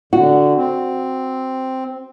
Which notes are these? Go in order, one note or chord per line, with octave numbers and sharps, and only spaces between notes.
D3 F#4
C4